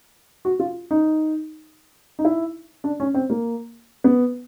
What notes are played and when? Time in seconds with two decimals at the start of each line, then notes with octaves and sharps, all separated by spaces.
0.45 F#4
0.60 F4
0.91 D#4
2.19 D#4
2.25 E4
2.84 D4
3.00 C#4
3.14 C4
3.30 A#3
4.04 B3